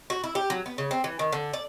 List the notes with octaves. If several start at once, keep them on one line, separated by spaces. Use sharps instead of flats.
F#4
E4
G4
F#3
B3
C#3
C4
E3
D#3
D3
D5